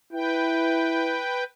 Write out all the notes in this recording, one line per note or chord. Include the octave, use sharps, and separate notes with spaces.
E4 B4 G5